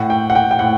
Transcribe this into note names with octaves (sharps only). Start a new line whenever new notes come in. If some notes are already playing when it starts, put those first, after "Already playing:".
Already playing: A2 F#5
G5
F#5
G5
G5
A2 F#5